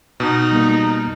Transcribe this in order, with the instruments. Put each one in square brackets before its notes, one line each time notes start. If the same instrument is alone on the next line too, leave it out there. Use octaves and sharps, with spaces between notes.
[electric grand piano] B2 [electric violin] D#4
[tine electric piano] G3 A#3